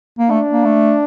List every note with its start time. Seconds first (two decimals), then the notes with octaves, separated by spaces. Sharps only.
0.19 A#3
0.30 A3 D4
0.53 A#3
0.65 A3